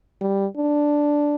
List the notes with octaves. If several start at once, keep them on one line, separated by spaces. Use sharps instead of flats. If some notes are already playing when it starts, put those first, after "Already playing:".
G3
D4